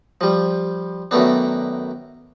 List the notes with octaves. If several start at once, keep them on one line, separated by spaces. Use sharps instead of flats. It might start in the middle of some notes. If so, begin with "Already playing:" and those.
F3 G3
F#2 D#3 A3 B3 D4